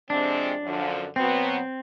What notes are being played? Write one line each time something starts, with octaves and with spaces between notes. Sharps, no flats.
F2 C3 F3 G#3 C4 D4
F#2 D3 F3
B2 F#3 B3 C4